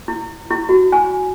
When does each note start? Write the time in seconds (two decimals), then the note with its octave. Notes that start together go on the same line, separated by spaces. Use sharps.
0.08 E4
0.50 E4
0.69 F#4
0.92 G#5